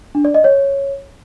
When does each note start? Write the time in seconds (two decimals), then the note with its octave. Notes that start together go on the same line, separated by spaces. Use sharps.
0.15 D4
0.25 D5
0.34 D#5
0.44 C#5